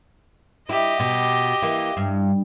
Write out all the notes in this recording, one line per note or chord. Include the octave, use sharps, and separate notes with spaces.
E4 G4 D#5
B2
E3 A#3
G2